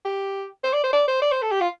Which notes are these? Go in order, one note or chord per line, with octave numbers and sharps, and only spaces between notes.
G4
C5
D5
C5
D5
C5
D5
C5
A4
G4
F4